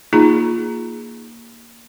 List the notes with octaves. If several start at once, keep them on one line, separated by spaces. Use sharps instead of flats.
A#3 D#4 F4 G#4 A#5